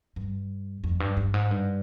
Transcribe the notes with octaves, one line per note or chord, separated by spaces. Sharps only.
G2
F2
G2
G2
G#2
G2